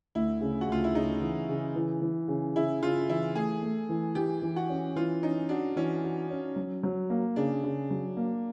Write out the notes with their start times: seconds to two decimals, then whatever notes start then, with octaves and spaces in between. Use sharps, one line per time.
0.15 D2 E4
0.41 C#3
0.61 F#4
0.68 D2 F4
0.84 E4
0.95 C#3 D#4
1.22 E3
1.49 C#3
1.75 E3
2.02 E3
2.28 C#3
2.56 C#3 E4
2.82 C#3 F4
3.09 E3 E4
3.35 A3 G#4
3.63 A3
3.89 E3
4.15 E3 G4
4.42 E3
4.56 F#4
4.69 C#4
4.96 E3 F4
5.23 C#4 D#4
5.49 D4 F#4
5.76 E3 C#4
6.03 F#4
6.30 C#4
6.56 F#3
6.83 F#3
7.10 A#3
7.36 C#3 D4
7.64 C#3
7.90 F#3
8.17 A#3